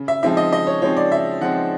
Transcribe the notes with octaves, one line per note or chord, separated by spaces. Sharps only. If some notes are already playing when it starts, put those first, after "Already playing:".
Already playing: C#3
E5
F3 G#3 C4 D#4 E5
D#5
C#3 D#5
C#5
F3 G#3 C4 D#4 C#5
D5
C#3 E5
F3 G#3 C4 D#4 F#5